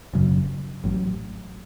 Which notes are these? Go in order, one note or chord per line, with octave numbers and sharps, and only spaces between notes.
F#1 F#2 C#3 F#3
A1 A2 F#3